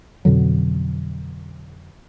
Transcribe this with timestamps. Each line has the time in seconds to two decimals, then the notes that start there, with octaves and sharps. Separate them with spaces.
0.25 F2 B2 D3 F#3